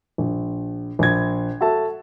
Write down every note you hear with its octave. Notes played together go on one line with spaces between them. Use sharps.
A#1
A#1 G#6
F#4 A4 E5 A5